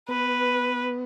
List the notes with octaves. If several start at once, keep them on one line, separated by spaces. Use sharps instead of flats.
B3 B4